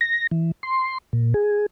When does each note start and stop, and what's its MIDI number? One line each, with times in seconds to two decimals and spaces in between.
0.01 0.27 94
0.31 0.51 52
0.63 0.98 84
1.13 1.34 46
1.34 1.66 68